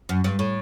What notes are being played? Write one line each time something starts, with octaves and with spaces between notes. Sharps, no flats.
F#2
G2
A2